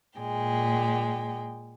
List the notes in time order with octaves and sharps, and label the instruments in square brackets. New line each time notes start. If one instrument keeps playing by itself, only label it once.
[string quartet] A#2 G#3 G5